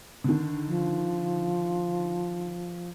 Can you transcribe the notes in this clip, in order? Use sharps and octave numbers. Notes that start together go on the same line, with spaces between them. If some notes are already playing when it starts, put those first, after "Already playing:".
D3 D#3
F3